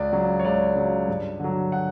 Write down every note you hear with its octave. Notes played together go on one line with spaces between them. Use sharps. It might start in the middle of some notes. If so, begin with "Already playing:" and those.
Already playing: C#2 D5
C#3 F#3
C#5
C#2 D5
C#3 F#3
G2
D3 F#3
F#5